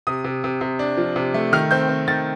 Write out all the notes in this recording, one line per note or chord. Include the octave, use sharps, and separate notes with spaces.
C3 D#6
C3
C3
C3
D4
F3
C3
A3
D#3 F6
C4 G6
C4
D#3 A6